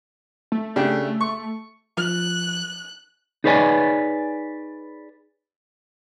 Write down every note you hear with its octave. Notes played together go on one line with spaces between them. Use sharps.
A3
C#3 D4 G4
C#6
F3 F#6
D#4 G#4 B4 C#5 D5 G#5